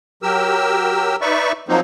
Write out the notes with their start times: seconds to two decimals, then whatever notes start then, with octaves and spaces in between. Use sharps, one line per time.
0.23 F#3 G4 A#4 E6
1.21 D#4 B4 D5 E5 C#6
1.68 F3 F#3 A#3 C4 D#4